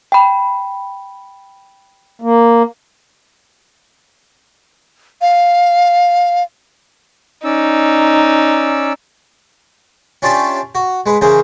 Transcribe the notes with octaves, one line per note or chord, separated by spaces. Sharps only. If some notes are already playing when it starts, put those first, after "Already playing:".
G5 B5
A#3
F5
C#4 D#4 D5 E6
C#4 D4 F4 G4 D5 E5
F#4
G#3 B4
C#3 E3 G#4 A#4 C5